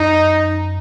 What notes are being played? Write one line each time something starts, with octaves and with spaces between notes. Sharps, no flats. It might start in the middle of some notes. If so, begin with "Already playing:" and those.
Already playing: F#2 D#4